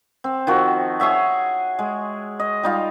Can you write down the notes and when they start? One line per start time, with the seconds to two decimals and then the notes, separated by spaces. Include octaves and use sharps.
0.24 C4
0.47 D#3 F3 F#4
1.00 G#4 C#5 E5 F#5
1.79 G#3
2.40 D#5
2.63 G3 D#4 F4